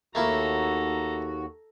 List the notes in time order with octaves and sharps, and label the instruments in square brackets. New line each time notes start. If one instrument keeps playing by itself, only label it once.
[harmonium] D#2 F#4 [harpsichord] A3 A#3 E4 [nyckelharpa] A4 A#5